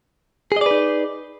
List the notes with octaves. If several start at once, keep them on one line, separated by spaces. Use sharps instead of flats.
D#4 G#4 B4 D5 D#5